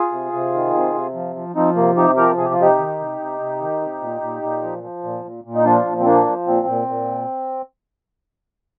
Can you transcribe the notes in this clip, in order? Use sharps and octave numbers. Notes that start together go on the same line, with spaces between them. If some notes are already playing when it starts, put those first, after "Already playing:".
Already playing: F4 G#4
C3
C3
D#3
C3
C3
F3
F3
F3 C4 D#4
C3 A#3
C3 D#4 G4
F3 G4 A#4
C3 G#4
G4
F4
C3 D#4 G4
D#3
C3
C3
C3
D#3
C3
A#2
A#2
A#2
F3
F3
A#2
A#2
A#2
D#4
F3 D4 F4
A#2
C4
F3 A#3 D4
F3
A#2 C4
A#2
A#2